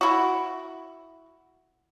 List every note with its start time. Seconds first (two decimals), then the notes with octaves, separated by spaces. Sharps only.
0.01 E4 F#4